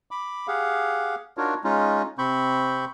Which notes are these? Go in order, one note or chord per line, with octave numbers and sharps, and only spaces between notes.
B5 D6
G4 G#4 F5 F#5
D4 D#4 F4 F#4 A#4 C#5
G#3 C#4 D#4 F4
C3 C4 B5 C#6 G6